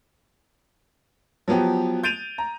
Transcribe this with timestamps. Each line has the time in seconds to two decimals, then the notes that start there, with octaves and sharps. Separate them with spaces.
1.48 F3 F#3 B3 G4
2.03 G6 A6 D7 D#7 F7
2.38 A#5